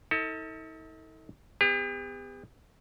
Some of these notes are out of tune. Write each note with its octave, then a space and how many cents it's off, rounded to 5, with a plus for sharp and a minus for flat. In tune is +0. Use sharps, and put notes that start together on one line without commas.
D#4 +45 A4 +30
B3 +25 G4 +45